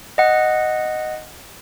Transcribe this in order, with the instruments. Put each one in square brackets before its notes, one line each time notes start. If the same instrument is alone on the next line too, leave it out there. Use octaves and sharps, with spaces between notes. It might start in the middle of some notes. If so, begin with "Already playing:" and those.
[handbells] D#5 F#5